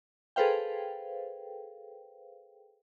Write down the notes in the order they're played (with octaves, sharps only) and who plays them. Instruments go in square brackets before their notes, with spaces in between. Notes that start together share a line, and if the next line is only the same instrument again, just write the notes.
[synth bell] G#4 A4 B4 C5 F5 G5